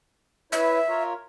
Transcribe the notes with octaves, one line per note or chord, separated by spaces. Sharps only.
E4 B4 C#5 E5
F4 A#4 C#5